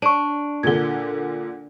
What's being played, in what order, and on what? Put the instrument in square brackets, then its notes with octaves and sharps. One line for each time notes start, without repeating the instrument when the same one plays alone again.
[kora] D4 [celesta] C#6 D#7
[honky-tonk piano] A#2 D3 [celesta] G#6 G7